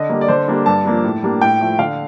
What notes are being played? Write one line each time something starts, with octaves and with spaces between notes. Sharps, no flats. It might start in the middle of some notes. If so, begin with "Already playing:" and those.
Already playing: D3 D#5
G3 A#3
D5
D3 C5
G3 A#3 D4
G2 A5
F3 A#3 D4
A2
G3 A#3 D4
A2 G5
F3 A3
D3 F5